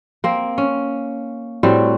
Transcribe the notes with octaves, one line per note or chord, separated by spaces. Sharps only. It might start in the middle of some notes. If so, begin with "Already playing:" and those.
A#3 C4
C#4
A2 G3 C4 F#4